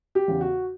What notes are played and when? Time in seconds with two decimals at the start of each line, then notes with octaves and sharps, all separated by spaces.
0.15 G4
0.28 E2 C#3
0.41 F#4